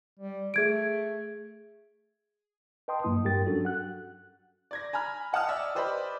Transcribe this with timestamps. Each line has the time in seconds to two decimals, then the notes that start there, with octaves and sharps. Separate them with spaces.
0.19 G3
0.54 A3 G#4 G#6 D7
2.88 B4 D#5 G5 A5 C6 D#6
3.04 G2 F#3 A#3 E4 D#6
3.25 G2 G3 G4 A#4 G5 A6
3.46 F#3 C#4 D4 F#4 A4
3.65 F#5 F#6
4.71 D5 G#6 A#6
4.93 G#5 A#5 B5 F6
5.33 D#5 F#5 A5 D#6 F6
5.49 D5 E5
5.75 G4 B4 C5 D5 D#5 B5